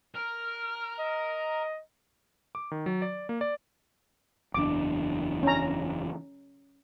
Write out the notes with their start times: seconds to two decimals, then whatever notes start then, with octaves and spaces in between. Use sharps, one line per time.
0.14 A#4 F6
0.99 D#5
2.55 D6
2.71 D#3
2.86 F#3
3.02 D5
3.29 A#3
3.41 D5
4.54 F#1 E2 D4 D6
5.43 C#4 A#5